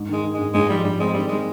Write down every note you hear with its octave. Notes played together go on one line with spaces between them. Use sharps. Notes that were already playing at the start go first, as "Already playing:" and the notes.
Already playing: G#2
D#3 G#3
D#3
G#2 G#3
G#2 G#3
F3 G3
G#2 G3
G#3 C4
D#3 G3
G3 G#3